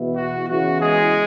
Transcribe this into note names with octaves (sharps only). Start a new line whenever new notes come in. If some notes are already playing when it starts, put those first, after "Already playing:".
Already playing: E2 B2 B3 E4
F#4
E2 C#3 E3 B3 E4 F#4
G#3 G#4